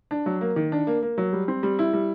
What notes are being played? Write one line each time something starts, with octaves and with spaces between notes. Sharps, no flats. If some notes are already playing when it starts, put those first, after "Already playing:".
D4
F#3
A#3
D#3
D4
A#3
A#3
F#3
G3
C4
G3
E4
G3